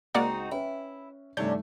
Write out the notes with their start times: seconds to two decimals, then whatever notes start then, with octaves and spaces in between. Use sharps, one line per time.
0.15 C#2 A#3 C4 D#4 F#4 D5 F#5 A#5
0.51 C#4 E4 B4 E5
1.37 G2 C3 D#3 A3 C#4 D4 G6